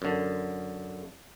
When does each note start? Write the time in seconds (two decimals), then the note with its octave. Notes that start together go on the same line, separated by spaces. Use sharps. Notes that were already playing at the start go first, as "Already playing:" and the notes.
0.02 F#2 D3